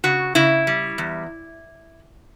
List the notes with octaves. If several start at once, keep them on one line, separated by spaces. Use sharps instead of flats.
C#3 F#4
C#3 E4
G3
E2